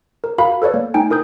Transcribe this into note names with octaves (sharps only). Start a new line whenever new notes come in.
A#4
F#4 A#4 F5 B5
A4 B4 C#5 D5
A#3
A3 D#4 G5 G#5
E4 A#4 D#6 G6